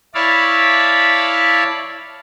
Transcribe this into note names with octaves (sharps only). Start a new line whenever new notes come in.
E4 C#5 D5 F5 A5 B5